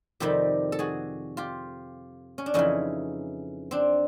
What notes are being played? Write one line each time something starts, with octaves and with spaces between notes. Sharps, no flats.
F2 C3 D#3 G3 G4 A4
A4
F#4 G#4
F4 G4
C#4
D4
F2 C#3 E3 C#4 D#4
C4 D4